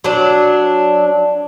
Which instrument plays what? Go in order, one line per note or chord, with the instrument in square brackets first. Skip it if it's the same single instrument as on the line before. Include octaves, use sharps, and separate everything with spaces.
[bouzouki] F#3 D4